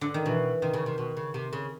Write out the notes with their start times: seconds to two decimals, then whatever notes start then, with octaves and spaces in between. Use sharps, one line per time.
0.01 D3
0.14 D#3
0.26 B2 E3
0.62 C3 D#3
0.74 C#3
0.86 C3
0.98 B2
1.17 C#3
1.34 C3
1.53 C#3